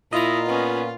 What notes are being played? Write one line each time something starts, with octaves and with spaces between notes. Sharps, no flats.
A#2 E4 F4 D#5 A#5
B3 C#4